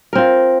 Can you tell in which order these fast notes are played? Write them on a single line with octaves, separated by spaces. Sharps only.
A#4 C4 F4